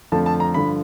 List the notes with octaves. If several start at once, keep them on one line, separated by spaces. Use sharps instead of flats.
F2 D3 F3 A3 A5
A5
A#5
G2 D3 F3 B5